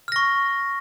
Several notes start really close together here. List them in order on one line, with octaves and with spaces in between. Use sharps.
F6 A#6 C#6